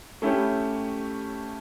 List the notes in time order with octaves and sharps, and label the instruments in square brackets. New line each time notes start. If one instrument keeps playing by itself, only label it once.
[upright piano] A3 C#4 E4 G4